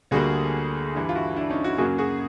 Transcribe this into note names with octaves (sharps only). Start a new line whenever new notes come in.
D2 D3 G3 A#3 F#4 G#4
G2 E3 G3
F4
E4 F#4
D4 E4
C#4 D#4
E4 F#4
F#2 C#3 F#3 A#3 F#4 G#4
F#4 G#4